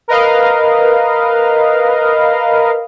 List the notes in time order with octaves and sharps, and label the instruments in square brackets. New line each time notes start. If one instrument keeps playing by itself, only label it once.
[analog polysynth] A#4 B4 D#5 F5